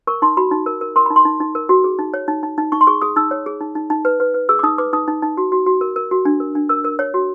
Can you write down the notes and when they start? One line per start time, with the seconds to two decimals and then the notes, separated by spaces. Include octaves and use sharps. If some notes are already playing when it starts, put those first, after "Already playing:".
0.07 A#4 C#6
0.22 D#4 C6
0.37 F#4 B5
0.51 D#4
0.66 A#4
0.81 A#4
0.96 A#4 C6
1.06 D#4 B5
1.16 C6
1.25 D#4
1.40 D#4
1.55 A#4
1.69 F#4
1.84 G#4
1.99 D#4
2.14 C#5
2.28 D#4
2.43 D#4
2.58 D#4
2.72 D#4 C#6
2.81 C6
2.87 G#4 C#6
3.02 G#4 D#6
3.16 D#4 E6
3.31 C#5
3.46 G#4
3.60 D#4
3.75 D#4
3.90 D#4
4.05 B4
4.20 B4
4.34 B4
4.49 G#4 E6
4.59 D6
4.63 D#4 D#6
4.78 B4 D6
4.93 D#4 D#6
5.08 D#4
5.22 D#4
5.37 F#4
5.52 F#4
5.66 F#4
5.81 A#4
5.96 A#4
6.11 F#4
6.25 D4
6.40 A#4
6.55 D4
6.69 A#4 E6
6.84 A#4
6.99 C#5
7.14 F#4